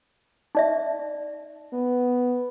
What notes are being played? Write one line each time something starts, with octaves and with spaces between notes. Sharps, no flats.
D#4 D5 E5
B3